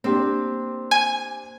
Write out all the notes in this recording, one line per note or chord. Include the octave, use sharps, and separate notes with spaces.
A#3 C4 D4 G4
G#5